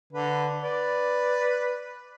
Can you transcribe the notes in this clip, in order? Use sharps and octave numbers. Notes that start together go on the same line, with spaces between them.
D3 B4
B4 D5